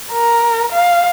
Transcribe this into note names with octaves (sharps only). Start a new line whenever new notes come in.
A#4
F5